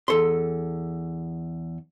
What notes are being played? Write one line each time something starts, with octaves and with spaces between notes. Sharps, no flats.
E2 A4 C6